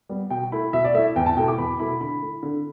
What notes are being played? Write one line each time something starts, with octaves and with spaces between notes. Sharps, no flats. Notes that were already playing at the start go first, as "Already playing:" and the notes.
G3 B3
B2 G5
A3 E4 B5
B2 E5
D5
A3 E4 E5
E2 G5
A5
B2 A3 E4 G5
D6
E2 B5
B2 A3 E4 B5
D3 B5
A3 E4
D3